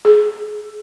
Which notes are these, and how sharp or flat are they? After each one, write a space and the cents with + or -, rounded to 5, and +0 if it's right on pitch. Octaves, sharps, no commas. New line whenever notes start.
G#4 +30